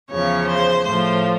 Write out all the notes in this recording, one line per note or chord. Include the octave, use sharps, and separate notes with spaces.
E2 C#3 F3 C#5
C5
A2 F3 C5